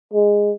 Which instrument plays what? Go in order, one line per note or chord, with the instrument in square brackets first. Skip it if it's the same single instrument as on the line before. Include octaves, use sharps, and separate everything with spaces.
[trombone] G#3